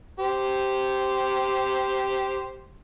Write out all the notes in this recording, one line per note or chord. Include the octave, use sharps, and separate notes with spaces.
G4 C5